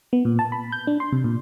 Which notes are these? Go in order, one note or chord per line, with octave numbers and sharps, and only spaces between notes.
B3
A#2
A5
B5
G6
D4
C6
C3
A#2